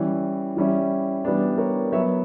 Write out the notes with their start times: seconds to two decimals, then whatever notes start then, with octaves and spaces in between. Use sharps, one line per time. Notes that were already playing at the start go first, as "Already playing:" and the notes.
Already playing: E3 G3 C#4
0.57 E3 G3 C#4 E4
1.24 E3 G3 B3 D4
1.58 A#4 C#5
1.92 F#3 B3 E4 C#5 E5